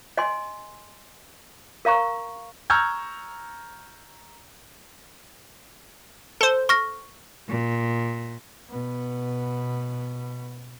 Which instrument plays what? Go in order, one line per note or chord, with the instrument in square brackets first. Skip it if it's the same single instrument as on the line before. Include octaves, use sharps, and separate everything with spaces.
[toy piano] D#5 G#5 C6
A#4 F5 A#5 C#6
[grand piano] A#5 C#6 E6 F6 G6 G#6
[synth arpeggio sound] A4 C5
[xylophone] C#6 F6 A#6
[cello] A#2
[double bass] B2 B3